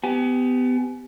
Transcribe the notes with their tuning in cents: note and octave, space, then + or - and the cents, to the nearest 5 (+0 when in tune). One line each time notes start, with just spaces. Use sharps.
B3 +25 G4 +0 G#5 +30